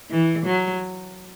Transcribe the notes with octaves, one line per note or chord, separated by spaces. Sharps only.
E3
F#3